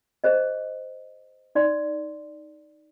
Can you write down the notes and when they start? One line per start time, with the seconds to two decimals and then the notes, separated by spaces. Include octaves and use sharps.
0.24 G#4 C5 D#5
1.55 D#4 D5 C6